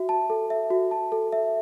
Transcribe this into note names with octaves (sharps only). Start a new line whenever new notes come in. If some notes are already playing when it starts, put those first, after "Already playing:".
Already playing: F#4 E5
A5
A4
E5
F#4
A5
A4
E5